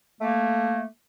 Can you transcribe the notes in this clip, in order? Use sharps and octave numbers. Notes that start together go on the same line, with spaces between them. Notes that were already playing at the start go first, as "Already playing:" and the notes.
A3 A#3